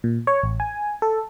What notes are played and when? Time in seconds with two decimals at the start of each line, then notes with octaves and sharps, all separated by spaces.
0.04 A#2
0.27 C#5
0.43 A1
0.60 G#5
1.02 A4